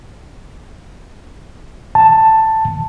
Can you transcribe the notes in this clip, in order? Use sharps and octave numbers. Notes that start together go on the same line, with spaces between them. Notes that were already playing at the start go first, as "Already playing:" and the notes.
A5